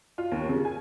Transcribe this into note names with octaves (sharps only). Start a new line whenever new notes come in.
F4
D#2
C#3
G#5